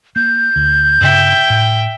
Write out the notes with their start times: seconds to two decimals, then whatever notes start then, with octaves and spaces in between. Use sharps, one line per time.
0.16 A#3 G6
0.56 D2
1.01 G2 C#3 E5 G5
1.50 A2